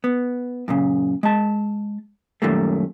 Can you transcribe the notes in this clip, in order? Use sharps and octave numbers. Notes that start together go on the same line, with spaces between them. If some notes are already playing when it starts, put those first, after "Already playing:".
B3
F#2 A#2 C#3
G#3 A5
F#2 A#2 D#3 G3 A3 A#3